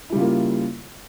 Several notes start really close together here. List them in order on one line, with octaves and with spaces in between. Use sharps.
E4 G3 C#3 F4 A#3